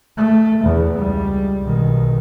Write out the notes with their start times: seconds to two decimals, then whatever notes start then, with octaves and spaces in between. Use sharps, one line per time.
0.17 A3
0.64 E2
0.97 C#2 G3
1.63 B1 D#3